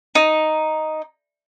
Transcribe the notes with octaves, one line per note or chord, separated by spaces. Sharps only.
D#4